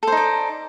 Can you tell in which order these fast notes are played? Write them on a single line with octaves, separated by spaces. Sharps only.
A4 C5 D#4 D5